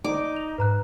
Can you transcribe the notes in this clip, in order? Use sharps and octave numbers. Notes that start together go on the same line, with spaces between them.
D#4 D5 D6
F7
G#2 B4 A#5 F#6